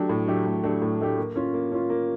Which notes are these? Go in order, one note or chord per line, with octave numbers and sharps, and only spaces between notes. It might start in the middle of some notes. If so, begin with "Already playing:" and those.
Already playing: F#3 A3 D4 G4
A2
F#3 A3 D4 G4
A2
F#3 A3 D4 G4
A2
F#3 A3 D4 G4
A#3
C#4 F4
A#3
C#4 F4
A#3